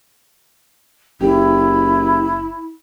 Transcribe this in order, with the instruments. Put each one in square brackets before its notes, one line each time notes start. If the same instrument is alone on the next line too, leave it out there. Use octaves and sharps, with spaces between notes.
[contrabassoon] F#1 [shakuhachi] E4 [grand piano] G4